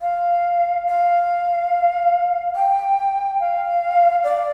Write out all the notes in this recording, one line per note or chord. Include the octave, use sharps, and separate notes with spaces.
F5
F5
G5
F5
D5